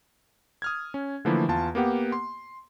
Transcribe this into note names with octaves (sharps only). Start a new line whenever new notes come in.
D#6 F6 G#6
C#4
D3 E3 F3 A3 A#3 E4
E2 F4 A5
A#3 B3 G4 F#5
C6